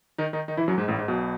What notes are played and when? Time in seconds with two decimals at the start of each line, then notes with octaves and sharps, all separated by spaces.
0.18 D#3 D#4
0.33 D#3 D#4
0.48 D#3 D#4
0.57 E3 E4
0.68 F#2 F#3
0.78 G#2 G#3
0.88 A1 A2
0.98 G#2
1.08 B1 B2